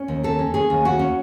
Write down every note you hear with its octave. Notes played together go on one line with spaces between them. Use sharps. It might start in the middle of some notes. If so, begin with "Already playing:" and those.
Already playing: C#4
D#2
D#3 A4
C#4
C#4 G#4
D#2
C#4 F#4
C#4